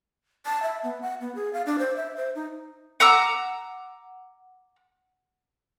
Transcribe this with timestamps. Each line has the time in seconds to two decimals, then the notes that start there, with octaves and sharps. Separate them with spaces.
0.46 A5
0.63 E5
0.83 B3
1.02 F#5
1.21 B3
1.35 G#4
1.53 F5
1.66 D4
1.79 C5
1.97 E5
2.16 C5
2.35 D#4
3.00 F#5 A#5 D6 E6